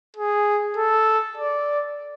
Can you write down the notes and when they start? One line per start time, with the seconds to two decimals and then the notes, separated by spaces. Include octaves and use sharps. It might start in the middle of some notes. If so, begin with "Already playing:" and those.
0.16 G#4
0.77 A4
1.37 D5